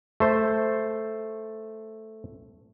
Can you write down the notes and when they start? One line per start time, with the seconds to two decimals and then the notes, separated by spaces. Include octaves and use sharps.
0.20 A3 C5